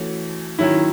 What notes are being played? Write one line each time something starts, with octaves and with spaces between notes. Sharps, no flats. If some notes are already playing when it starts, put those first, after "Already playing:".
Already playing: E3 A3 C#4 F#4
D#3 F#3 C#4 E4